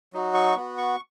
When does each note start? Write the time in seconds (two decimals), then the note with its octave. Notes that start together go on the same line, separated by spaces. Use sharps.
0.13 F#3 D#4 F#4
0.34 C#6
0.56 B3 F#4
0.78 C#6